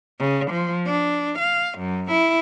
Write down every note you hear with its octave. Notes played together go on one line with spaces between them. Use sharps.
C#3
F3
D4
F5
F#2
E4